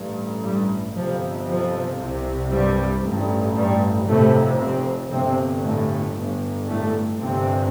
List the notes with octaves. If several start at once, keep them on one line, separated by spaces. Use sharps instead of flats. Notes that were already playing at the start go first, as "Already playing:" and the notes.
Already playing: A1 G2
G2 G3
G1 F2 C3 F3
F3
C2 C3
G2 G3
A1 G2
G2 G3
F1 F2 A2 C3 A3
C3 C4
G1 G2 C3 C4
A2 A3
G1 G2
A2 A3
G1 G2 C3 C4